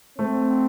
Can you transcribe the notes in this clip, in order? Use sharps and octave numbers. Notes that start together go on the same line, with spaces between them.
A3 C4